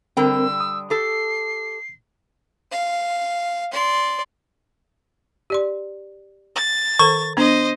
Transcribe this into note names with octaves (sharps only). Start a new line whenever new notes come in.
D3 G3 C4 A#4 G5 E6
D#6
G4 A4 C7
F5
D5 C6
G4 D5 C6
A6
D#3 A4 C5 C#6
B3 D4 C5 D#5